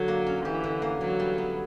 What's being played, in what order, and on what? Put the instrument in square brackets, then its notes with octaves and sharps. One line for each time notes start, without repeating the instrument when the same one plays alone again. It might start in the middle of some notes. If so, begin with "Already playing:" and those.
Already playing: [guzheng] D3 [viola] F#3
[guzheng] A#3
C#4
[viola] E3 [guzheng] G4
[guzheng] D3
A#3
[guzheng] E3 [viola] F#3
[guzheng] G3
B3